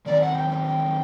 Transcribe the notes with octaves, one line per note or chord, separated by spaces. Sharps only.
D#3 F#3 C4 D#4 D5
F#5
G5
G5
G5